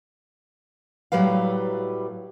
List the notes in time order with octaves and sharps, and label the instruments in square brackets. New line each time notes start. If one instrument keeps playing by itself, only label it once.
[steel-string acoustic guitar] A2 F#3 G3 B4 F5